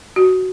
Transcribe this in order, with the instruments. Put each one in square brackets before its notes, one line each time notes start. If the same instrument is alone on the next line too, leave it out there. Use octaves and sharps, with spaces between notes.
[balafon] F#4